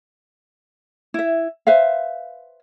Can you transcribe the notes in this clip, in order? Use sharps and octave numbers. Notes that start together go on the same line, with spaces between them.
E4 E5
B4 C5 E5 F5